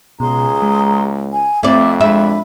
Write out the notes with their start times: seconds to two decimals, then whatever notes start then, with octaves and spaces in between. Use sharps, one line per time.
0.20 C#2 B2 G#4 A#5 C6
0.62 G#3
1.32 G#5
1.63 F2 A3 C4 E4 D5 E5
2.01 G#3 D4 E5 B5